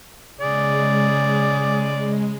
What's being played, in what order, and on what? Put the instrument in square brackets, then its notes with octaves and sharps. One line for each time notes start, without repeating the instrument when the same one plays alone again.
[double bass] C#3 [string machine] G#3 [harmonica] G#4 D5